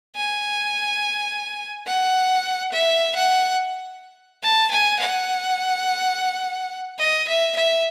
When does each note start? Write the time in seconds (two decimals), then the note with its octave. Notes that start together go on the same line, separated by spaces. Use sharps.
0.16 G#5
1.86 F#5
2.72 E5
3.15 F#5
4.43 A5
4.71 G#5
4.99 F#5
6.98 D#5
7.28 E5
7.56 E5